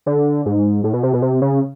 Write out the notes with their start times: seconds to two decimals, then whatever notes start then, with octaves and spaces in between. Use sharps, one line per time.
0.06 D3
0.46 G#2
0.84 A2
0.93 B2
1.03 C3
1.13 B2
1.22 C3
1.42 C#3